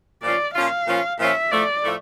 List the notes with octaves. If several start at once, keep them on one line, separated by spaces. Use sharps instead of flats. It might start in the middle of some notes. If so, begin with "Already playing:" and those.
A#2 F3 C#4 F4 D5
A#2 F3 C#4 F4 F5
A#2 F3 C#4 F4
A#2 F3 C#4 F4 E5
A2 F3 A3 D5
A2 F3 A3